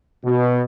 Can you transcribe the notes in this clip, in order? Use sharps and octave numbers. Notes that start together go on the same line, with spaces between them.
B2